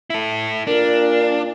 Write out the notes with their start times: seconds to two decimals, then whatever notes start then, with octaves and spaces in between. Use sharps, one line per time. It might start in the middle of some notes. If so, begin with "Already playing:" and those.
0.10 E4 A4
0.67 A#2 D4 A#4